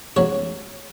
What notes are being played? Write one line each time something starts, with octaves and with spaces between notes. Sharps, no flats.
A1 G#2 F#3 C#5